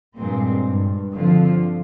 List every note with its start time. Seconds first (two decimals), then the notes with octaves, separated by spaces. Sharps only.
0.16 G2 A#2 G#3 C4
0.65 G2
1.14 D3 F3 C4 F4